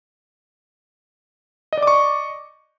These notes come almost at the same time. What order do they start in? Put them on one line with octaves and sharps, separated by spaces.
D#5 D5 D6 C#6